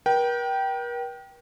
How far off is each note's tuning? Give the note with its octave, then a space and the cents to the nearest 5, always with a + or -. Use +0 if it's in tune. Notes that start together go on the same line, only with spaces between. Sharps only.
A#4 +45 G5 -15